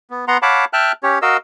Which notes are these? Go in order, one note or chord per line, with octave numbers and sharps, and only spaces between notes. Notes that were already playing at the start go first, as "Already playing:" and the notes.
B3
B3 F#5 A#5 C6
C#5 F5 F#5 A5 B5 D6
E5 G5 A5 F6 F#6
C#4 G4 C#5
F#4 A#4 D#5 F5 E6